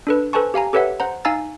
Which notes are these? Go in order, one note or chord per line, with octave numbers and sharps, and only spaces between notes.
D4 A4 B4
A4 B4 C5 G#5 A5 C#6
G4 F5 G#5 A#5
G4 A4 B4 C#5 E5 F#5
C5 F#5 A#5
D#4 F5 G#5 A#5 E6 A6